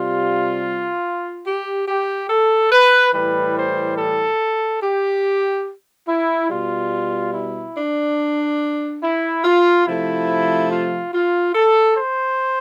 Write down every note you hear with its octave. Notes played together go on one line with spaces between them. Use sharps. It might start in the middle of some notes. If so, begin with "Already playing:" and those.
Already playing: C3 G3 F4
G4
G4
A4
B4
A2 E3 G3 B4
C5
A4
G4
E4
B2 G3 F4
E4
D4
E4
F4
C3 F3 A3 E4
F4
F4
A4
C5